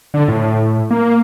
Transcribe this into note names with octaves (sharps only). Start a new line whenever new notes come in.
D3
A2
A#3